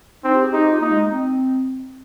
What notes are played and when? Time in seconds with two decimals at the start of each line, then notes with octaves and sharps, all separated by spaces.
0.24 C4 D#4
0.34 G4
0.43 G#4
0.53 D#4 G4
0.63 G4
0.72 F4
0.81 A#3 D#4
0.91 G#3
1.11 C4